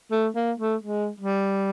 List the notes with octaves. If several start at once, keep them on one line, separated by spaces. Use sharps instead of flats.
A3
A#3
A3
G#3
G3